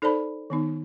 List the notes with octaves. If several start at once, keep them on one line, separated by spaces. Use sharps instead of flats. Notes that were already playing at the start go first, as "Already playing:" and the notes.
D#4 A4 C5 D5 A5 B5
D#3 B3 D#4